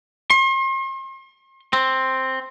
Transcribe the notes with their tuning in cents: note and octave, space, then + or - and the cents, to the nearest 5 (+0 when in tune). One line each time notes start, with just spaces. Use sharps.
C6 +40
C4 +5